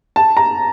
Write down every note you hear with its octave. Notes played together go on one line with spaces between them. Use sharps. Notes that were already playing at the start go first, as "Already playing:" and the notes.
A5
A#5